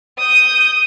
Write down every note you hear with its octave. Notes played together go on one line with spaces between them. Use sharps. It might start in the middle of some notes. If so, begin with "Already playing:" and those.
D#6 G6